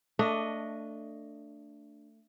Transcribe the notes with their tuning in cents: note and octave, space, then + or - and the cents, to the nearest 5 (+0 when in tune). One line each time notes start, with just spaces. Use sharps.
A3 +20 D4 +0 D#5 +0